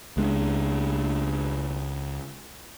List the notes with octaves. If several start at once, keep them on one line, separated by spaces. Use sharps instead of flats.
C#2 G#3 C4 D4